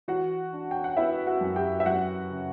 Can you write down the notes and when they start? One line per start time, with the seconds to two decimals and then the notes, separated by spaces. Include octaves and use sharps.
0.08 E3 F#4 F#5
0.53 D4
0.71 G5
0.84 F#5
0.97 B3 E4 E5
1.26 F#4 F#5
1.41 F#2
1.56 G4 G5
1.80 E5
1.86 F#3 F#4 F#5
2.31 C#3